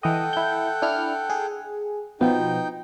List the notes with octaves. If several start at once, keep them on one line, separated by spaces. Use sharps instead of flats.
E3 A4 D#5 F#5 G5
E4 G6
D4 E4 F6
G#4
B2 F3 B3 D#4 G5